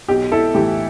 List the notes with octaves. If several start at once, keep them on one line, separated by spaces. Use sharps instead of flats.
B1 G4
E4 A4
A2 E3 G4